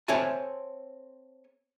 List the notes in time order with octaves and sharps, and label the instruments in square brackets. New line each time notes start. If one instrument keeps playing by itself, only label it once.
[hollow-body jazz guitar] C4 A4 C#5 E5 G#5 A5